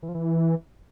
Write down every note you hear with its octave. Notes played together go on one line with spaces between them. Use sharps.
E3
F3
E3